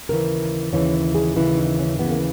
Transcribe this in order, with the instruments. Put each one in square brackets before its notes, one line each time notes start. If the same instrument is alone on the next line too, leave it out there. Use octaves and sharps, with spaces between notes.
[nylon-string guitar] D#2 C#3 E3 A#4
D#2 C#3 E3 C#5
G#4
D#2 C#3 E3 E4
D#4
C#4
D#2 C#3 E3 B3
A#3